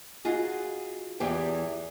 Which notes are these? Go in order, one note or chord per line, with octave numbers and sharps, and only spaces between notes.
D#4 F4 F#4 G#4
E2 E3 G4 G#4 G5